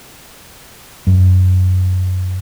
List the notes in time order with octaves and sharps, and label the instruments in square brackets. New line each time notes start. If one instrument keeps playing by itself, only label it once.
[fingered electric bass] F#2